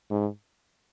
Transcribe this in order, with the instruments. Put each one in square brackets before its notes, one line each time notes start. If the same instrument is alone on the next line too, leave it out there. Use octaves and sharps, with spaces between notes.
[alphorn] G#2